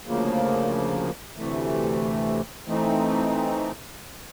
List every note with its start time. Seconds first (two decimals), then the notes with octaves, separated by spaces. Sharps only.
0.06 D2 C#3 F3 A#3
1.36 D2 C3 E3 A3
2.67 E3 A3 C4 D#4